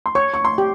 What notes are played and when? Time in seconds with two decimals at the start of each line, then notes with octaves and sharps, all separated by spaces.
0.06 C6
0.15 C#5 C#6
0.34 C#6
0.45 C6
0.58 G4